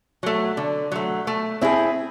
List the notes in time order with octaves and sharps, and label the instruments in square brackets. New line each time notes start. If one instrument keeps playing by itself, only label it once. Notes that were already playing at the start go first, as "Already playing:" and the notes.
[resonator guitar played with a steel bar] F#3 A3
D3
F#3 A3
A3
C4 E4 G#4